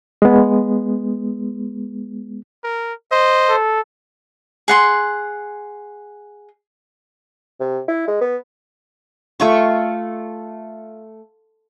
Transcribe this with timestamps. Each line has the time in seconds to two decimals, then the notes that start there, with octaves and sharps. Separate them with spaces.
0.22 G#3 B3
2.64 A#4
3.12 C5 D#5
3.49 A4
4.68 G#4 F#5 C6
7.60 C3
7.88 E4
8.07 G#3
8.21 B3
9.40 A3 F4 C#6